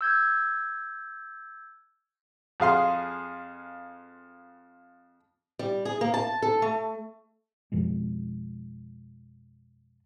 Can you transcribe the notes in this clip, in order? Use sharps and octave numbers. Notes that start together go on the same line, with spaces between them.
E6 G6 G#6
F2 G#4 F5 C6
G3
G#4
A#3
A5
A4
A3
F2 B2 F3 G#3